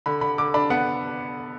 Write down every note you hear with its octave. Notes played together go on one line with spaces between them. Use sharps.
D3 B5
D3 B5
D3 D6
D4 B5
B3 F#5